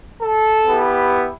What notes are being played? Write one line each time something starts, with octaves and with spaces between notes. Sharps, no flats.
A4
B3 E4 G4